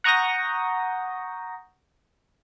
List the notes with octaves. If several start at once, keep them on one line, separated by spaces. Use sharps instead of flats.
F#5 A#5 C#6 D#6 G6 A#6